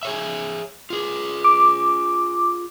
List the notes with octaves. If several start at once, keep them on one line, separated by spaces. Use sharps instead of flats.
G#4 C#5 E5
F4 G#4
D6